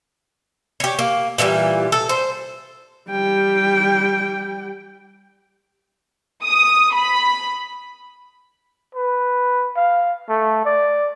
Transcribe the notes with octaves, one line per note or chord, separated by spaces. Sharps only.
G4 C#5
A#3
A#2 E3 F3 G3
A4
C5
G3 G5
D#6
B5
B4
F5
A3
D5